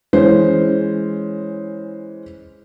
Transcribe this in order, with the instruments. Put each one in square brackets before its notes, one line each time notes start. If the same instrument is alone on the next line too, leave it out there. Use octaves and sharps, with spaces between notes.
[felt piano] E3 G#3 C#4 C5